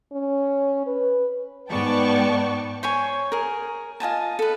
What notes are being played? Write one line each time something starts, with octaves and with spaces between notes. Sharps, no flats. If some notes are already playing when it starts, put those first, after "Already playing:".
C#4
B4
G#2 B3 D5 G5 A5 C#6
C5 C#5 G#5 C#6
G#4 A#4
F4 D#5 G#5 A5
A4 B4